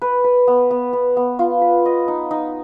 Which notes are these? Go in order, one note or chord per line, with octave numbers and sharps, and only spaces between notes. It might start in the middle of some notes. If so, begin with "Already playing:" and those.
B4
B4
B3
B3
B3
B3
F4
B4
D#5
D#4
D#4